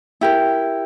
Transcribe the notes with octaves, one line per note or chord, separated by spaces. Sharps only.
E4 G4 A#4